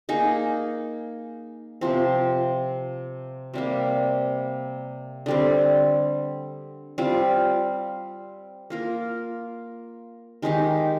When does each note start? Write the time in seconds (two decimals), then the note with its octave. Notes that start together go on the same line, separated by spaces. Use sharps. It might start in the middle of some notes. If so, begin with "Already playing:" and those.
0.09 A#3 D#4 G#4
1.81 C3 F3 C4
3.54 C3 G3 A#3
5.26 D3 G3 C4
6.98 G3 C4 F4
8.70 A#3 F4 A#4
10.42 D#3 G#3 D#4 G4